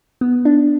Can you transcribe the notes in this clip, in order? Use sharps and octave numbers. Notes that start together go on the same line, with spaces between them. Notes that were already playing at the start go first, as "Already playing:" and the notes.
B3
D4